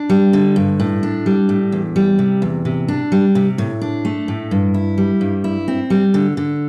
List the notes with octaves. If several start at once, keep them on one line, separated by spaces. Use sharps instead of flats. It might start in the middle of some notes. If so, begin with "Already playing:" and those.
Already playing: D4
G3
D3
G2
A2
D4
G3
A2
E2
G3
C3
E2
C3
D4
G3
C3
A2
D4
A3
A2
G2
E4
G3
G2
E4
C4
G3
D3
D3